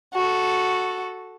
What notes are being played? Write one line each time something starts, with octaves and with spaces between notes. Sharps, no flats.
F#4 A4